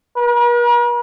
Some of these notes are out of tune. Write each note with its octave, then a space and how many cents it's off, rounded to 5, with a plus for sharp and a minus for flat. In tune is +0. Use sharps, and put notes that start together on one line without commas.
A#4 +45